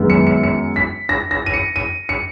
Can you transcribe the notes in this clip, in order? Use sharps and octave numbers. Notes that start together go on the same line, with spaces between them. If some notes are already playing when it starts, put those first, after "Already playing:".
Already playing: F#2 D#3 G#3 B3
C#7
C#7
C#7
B6
A#6
A#6
D#7
C#7
D#7
C#7